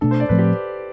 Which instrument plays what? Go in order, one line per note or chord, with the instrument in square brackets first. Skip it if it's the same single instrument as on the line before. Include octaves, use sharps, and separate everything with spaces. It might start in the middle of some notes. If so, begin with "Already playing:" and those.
[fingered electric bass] B2 A3 D4 [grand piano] A4
[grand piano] C5
D5
[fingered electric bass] A2 F3 A3 C4 [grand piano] B4
[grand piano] G4